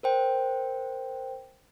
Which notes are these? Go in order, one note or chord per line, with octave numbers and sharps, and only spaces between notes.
A#4 C5 G5